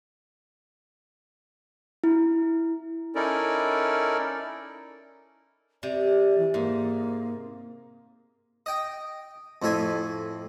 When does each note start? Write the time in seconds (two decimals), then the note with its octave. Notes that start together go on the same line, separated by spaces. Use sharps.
2.04 E4
3.15 C#4 D#4 E4 A4 A#4 D5
5.83 C3 D5
6.38 E3
6.54 G#2 A#3
8.66 D#5 G5
9.62 F2 A2 E5 G#5